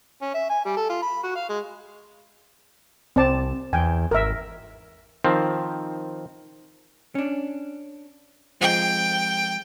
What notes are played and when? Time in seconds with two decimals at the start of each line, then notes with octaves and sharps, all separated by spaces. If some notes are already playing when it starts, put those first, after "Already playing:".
0.22 C#4
0.34 E5
0.50 G#5
0.65 G3
0.77 A4
0.90 F4
1.03 B5
1.24 F#4
1.36 F5
1.49 G#3
3.16 C2 C4 D5 A5
3.73 E2 G5 G#5
4.11 G#1 A#4 E5
5.25 D#3 F3 C4
7.15 C#4 D4
8.61 F3 G#3 C4 G5